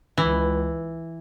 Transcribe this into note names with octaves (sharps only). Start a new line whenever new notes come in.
C#2 E3